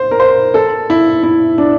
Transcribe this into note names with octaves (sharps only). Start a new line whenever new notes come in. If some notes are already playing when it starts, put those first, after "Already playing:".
Already playing: C5
A#4
C5
A4
E4
E4
D4